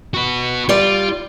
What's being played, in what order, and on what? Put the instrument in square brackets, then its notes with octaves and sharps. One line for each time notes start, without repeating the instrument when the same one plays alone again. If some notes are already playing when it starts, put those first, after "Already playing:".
[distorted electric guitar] F#4 B4
[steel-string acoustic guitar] G3 D5 [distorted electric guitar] F4